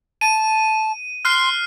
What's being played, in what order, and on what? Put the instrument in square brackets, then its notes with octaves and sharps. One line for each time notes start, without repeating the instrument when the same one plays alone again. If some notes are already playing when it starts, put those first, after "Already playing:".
[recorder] A5 [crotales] D#7
[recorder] C6 [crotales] F6 F#6 C7